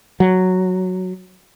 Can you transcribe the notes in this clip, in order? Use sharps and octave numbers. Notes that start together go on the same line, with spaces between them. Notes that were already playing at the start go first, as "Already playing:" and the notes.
F#3